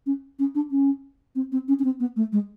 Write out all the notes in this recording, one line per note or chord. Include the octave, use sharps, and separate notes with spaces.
C#4
C#4
D4
C#4
C4
C4
C#4
C#4
C4
B3
A3
G#3